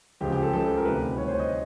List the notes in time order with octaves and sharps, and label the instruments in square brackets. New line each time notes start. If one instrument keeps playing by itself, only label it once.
[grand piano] C#2 C#3 F3 G4
G4
A4
C#2 C#3 F3 A4
A#4
D2 C3 D#3 G3 B4
D2 C3 D#3 G3 C#5
C5
D#5